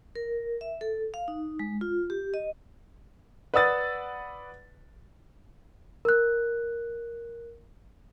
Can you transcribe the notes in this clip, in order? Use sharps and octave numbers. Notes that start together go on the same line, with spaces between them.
A#4
E5
A4
F5
D#4
G#3
F4
G4
D#5
B4 D5 F#5 D#6 E6 A6
A#4 F#6